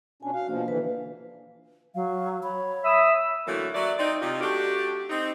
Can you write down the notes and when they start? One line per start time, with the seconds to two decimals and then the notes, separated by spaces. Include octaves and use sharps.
0.23 B2 C#4 D4 G#5
0.34 F#4 F5
0.48 A#1 B2 F3 F5
0.68 D3 E3 B4
1.95 F#3 F5
2.43 C#5 B5
2.84 E5 B5 D#6 E6
3.47 D3 E3 F#3 A3 A#3 E4
3.75 F#3 D5 E5
3.98 C4 D#4 D5
4.21 C3 D#4 F4
4.41 A3 D4 F#4 G4
5.10 C4 D#4